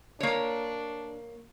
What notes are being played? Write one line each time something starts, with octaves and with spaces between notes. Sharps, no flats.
A#3 D4 C#5